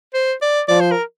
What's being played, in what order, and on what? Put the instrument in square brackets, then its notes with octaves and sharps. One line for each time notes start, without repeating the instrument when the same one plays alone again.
[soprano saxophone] C5
D5
[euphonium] F3 [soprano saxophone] D5
[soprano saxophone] C5
A#4